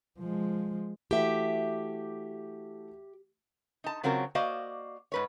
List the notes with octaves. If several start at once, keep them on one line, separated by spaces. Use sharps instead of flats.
F3 G#3
E3 A3 F#4 G4 E5
D#4 A5
C#3 F#3 C4 F4 F#4 A#4
A#3 F#4 C5 D5 D#5 F5
G#2 B4 C#5